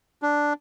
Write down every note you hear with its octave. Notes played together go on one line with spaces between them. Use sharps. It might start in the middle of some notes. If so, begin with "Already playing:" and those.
D4